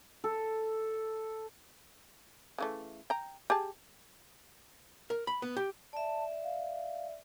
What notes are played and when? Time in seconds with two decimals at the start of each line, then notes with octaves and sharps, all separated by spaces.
0.24 A4
2.58 C#3 E3 A3
3.10 G5 A#5
3.50 G4 G#4 A5
5.10 A#4
5.27 B5
5.42 B3
5.57 G4
5.93 D5 E5 A5
6.44 F5